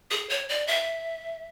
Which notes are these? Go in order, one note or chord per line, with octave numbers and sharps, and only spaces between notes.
G#4
C#5
D5
E5